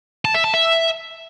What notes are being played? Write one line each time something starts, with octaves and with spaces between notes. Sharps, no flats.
A5
E5
A5
E5